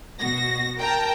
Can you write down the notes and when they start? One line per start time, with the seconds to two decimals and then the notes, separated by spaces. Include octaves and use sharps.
0.20 B2 F#4 A#6
0.78 A#4 G5 A5 A#5